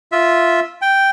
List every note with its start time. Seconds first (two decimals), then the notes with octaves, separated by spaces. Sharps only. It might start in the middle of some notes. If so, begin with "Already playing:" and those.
0.12 F4 E5
0.82 G5